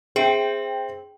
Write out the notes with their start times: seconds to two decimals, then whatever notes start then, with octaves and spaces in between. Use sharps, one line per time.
0.16 C4 G#4 E5 G5